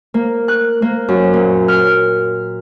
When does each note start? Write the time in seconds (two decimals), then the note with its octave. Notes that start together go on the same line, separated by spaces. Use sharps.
0.14 A#3
0.48 F#6
0.82 A#3
1.08 F#2
1.33 A#2
1.68 F6